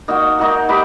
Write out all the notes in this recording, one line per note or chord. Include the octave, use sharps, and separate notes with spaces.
A#3 D#4 F#4
A#3 D#4 F#4
A#3 D#4 G4 B4